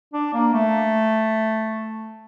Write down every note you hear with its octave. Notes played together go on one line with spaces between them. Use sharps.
D4
A#3
A3